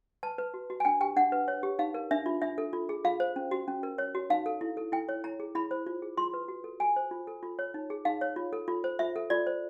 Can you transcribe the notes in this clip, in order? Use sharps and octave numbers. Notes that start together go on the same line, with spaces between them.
B4 A5
B4
F#4
F#4
G#5
D4 G5
G4 G5
D4 F#5
B4
C#5
G4
D#4 F5
A#4
D4 E5
F4
D4 E5
A4
F4
G#4
F4 F5
C5
C#4
F#4
C#4
A#4
C#5
F#4
D#4 F5
A4
E4
A4
E4 G5
C#5
E4 A#5
G#4
E4 B5
C5
F4
G#4
F4 C6
B4
F#4
A4
F#4 G#5
C5
F4
A4
F4
C#5
D#4
G#4
D#4 F5
C#5
F4
A4
F4
C5
F4 E5
A4
F4 D5
C5